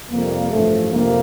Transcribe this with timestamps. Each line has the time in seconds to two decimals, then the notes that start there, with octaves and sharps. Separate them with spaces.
0.11 F2 C3 G3 A#3
0.51 A1 G2 F3 A3
0.91 F2 C3 A#3